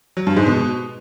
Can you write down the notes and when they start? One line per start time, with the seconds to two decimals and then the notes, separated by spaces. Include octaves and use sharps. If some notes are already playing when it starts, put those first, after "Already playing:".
0.17 F#3
0.27 G2
0.37 G#2
0.47 B2